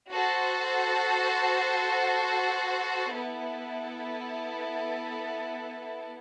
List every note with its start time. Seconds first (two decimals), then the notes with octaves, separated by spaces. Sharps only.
0.11 F#4 A4 C5
3.11 B3 E4 A4